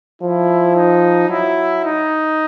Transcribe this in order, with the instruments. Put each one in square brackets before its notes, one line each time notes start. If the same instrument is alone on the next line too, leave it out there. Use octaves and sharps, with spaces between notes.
[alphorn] F3 [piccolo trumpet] E4
[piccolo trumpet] D#4
[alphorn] F#3 [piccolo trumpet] E4
[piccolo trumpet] D#4